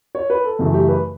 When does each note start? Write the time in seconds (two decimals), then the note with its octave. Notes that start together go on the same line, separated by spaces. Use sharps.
0.15 C#5
0.30 B4
0.44 A4
0.59 F#2 C#3 E3 A3
0.74 G4
0.88 B4